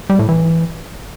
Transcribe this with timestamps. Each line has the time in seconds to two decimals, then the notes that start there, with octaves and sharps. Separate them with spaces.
0.10 G3
0.19 A2
0.29 E3